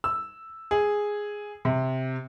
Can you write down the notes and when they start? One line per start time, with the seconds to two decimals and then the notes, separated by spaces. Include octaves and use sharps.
0.04 E6
0.71 G#4
1.65 C3